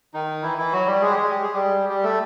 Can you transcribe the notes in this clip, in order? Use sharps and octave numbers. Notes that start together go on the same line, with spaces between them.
D#3 D#4
E3 E4
E3 E4
F#3 F#4
G3 G4
G#3 G#4
G4
G#3 G#4
G4
G#4
G3 G4
G3 G4
A3 A4